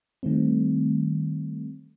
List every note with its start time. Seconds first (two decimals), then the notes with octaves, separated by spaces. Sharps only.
0.23 D#3 G3 A3 C4